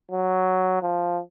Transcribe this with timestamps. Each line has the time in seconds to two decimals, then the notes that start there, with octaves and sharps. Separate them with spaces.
0.12 F#3
0.83 F3